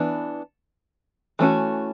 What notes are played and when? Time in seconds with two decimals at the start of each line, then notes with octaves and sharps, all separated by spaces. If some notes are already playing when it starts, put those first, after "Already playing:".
Already playing: E3 B3 D4
1.39 E3 A3 C#4 F#4